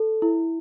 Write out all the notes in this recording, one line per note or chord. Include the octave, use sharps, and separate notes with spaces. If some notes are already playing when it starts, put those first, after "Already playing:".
Already playing: A4
E4